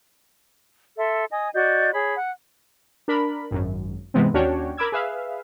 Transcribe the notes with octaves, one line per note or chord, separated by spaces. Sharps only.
A4 E5 C6
D#5 G#5 D#6
F#4 D5 D#5 G6
G#4 C#5 B5
F#5
D4 A#4 B5
G#1 F#2
G#2 C3 E3 G#3 B3 C4
D#2 C#4 D4 F#4 C#5 G5
A#4 B5 D6 E6 G#6
G#4 B4 E5 F5